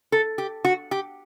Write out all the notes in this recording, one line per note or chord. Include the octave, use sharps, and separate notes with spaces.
A4
G4
F#4
G4